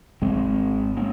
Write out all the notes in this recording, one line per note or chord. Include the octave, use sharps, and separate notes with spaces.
G#1 G2 G#3 C4
A#3 C#4